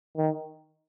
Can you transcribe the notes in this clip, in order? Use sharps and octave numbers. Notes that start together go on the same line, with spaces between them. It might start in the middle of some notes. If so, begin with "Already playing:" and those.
D#3